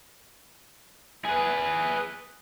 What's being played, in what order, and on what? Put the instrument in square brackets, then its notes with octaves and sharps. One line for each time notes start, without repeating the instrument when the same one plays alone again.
[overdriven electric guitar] G#4 B4